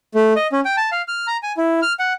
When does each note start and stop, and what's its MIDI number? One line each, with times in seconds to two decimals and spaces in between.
0.15 0.33 57
0.36 0.47 75
0.52 0.60 61
0.65 0.76 79
0.77 0.90 81
0.92 1.02 77
1.08 1.27 89
1.27 1.37 82
1.43 1.53 80
1.57 1.80 64
1.82 1.93 89
1.99 2.13 78